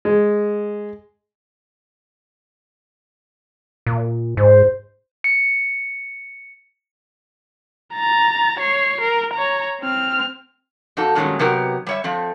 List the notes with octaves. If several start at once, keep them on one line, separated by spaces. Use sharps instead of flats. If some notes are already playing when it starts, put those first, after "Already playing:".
G#3
A#2
G#2 C5
C#7
A#5 A6
C#5 C7
A#4
C#5 A#5
C4 F6
F2 D#4 F#4 A4
G2 A#2 D#3 F#3 G#3 C#4
C3 F#3 B3 D#4 G4 A#4
G3 C#5 E5
F3 A3 C4